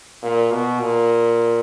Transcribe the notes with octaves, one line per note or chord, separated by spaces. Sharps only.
A#2
B2
A#2